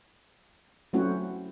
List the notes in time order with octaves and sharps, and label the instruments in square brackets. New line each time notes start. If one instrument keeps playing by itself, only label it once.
[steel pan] F#3 A3 C4 C#4 E4 F#4